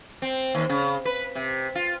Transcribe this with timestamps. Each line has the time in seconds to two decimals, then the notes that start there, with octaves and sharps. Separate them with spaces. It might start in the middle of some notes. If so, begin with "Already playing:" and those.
0.22 C4
0.55 D#2
0.69 C#3
1.05 B4
1.35 C3
1.75 F4